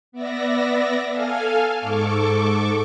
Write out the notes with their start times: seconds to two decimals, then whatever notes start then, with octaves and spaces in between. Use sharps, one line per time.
0.12 B3 D5 E5 A#6
1.10 A4 F5 G#5 F6
1.78 G#2 A4 C#6 D6